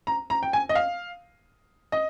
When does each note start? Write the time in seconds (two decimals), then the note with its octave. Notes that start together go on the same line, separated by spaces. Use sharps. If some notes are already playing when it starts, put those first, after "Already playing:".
0.07 A#5
0.30 A#5
0.43 G5
0.53 G#5
0.69 D#5
0.75 F5
1.92 D#5